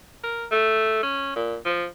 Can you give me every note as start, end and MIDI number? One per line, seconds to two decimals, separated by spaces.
0.24 0.45 70
0.52 0.98 57
1.03 1.36 61
1.36 1.57 46
1.65 1.86 53